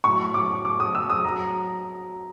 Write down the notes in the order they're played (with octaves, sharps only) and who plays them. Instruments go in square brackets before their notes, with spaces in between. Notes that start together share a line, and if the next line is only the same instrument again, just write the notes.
[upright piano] A2 F#3 C#6
D6
D6
D#6
E6
D#6
F#3 A#5